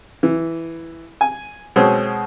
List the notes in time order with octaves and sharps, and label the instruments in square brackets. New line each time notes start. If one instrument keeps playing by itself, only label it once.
[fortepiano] E3
G#5
B2 G#3 C4 C#4